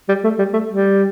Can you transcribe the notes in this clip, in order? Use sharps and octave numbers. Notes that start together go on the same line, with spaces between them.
G3
A3
G3
A3
G3